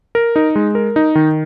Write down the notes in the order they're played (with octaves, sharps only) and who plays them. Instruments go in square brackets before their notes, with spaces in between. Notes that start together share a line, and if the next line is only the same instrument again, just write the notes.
[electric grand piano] A#4
D#4
G#3
A#4
D#4
D#3